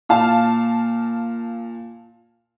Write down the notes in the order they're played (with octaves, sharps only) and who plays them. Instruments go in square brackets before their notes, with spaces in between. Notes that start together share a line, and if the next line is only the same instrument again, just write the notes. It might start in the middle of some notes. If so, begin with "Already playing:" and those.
[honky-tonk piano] A#2 F5 A5